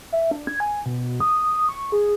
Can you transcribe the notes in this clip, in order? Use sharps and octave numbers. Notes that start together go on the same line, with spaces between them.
E5
D4
G#6
G#5
B2
D#6
C#6
G#4